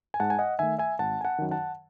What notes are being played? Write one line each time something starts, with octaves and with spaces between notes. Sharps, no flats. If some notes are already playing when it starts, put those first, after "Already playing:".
G#5
G#2 F#5 A5
G#5
D#5 F#5
D#3 A3 E5 G#5
E5 G#5
G#1 F#5 A5
G#5
F#5 A5
F#2 D#3
F#5 A5